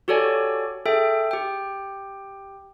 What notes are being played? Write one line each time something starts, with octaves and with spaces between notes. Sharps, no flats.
F#4 G4 A4 C#5 D5 G#5
G#4 A4 E5 G5
G4 G5